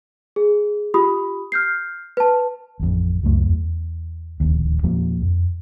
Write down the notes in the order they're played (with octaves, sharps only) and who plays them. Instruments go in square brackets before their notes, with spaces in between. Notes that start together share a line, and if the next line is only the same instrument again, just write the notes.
[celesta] G#4
F4 G4 B5 D#6
F6 G6 C7
B4 A5
[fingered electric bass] A1 F2
C#2 F#2 A3
E2
D1 A#1 D#2
E2 A#2 F3 A#3
F2